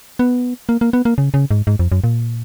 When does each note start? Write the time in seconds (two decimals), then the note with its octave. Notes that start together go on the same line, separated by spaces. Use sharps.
0.19 B3
0.69 A#3
0.81 A#3
0.93 B3
1.05 A#3
1.18 C#3
1.34 C#3
1.51 G#2
1.67 G#2
1.79 F2
1.92 F#2
2.04 A#2